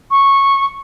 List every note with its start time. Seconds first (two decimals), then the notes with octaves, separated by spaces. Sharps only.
0.11 C#6